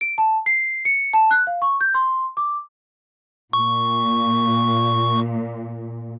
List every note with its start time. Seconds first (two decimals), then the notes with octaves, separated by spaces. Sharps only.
0.01 D7
0.18 A5
0.46 C7
0.85 C#7
1.13 A5
1.31 F#6
1.47 F5
1.62 C#6
1.81 G6
1.94 C6
2.37 D6
3.53 A#2 C#6